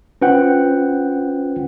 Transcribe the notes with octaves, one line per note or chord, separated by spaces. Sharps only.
C#4 F4 B4 C5 F#5 G5